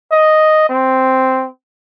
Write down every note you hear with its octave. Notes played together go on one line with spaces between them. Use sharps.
D#5
C4